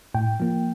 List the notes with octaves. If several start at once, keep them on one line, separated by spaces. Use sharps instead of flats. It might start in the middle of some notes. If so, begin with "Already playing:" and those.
A2 G5
F3 A#3